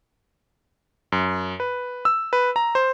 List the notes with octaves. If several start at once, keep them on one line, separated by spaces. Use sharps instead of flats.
F#2
B4
E6
B4
A#5
C5